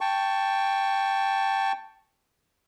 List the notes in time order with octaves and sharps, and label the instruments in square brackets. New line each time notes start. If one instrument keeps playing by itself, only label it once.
[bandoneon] G5 A5 C#6